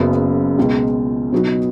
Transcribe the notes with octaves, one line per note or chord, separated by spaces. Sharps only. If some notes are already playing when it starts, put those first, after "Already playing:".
Already playing: F#1 F#2 C#3 B3 F#4
C#2 B2 G#3
B2 F#3 B3 D#4 F#4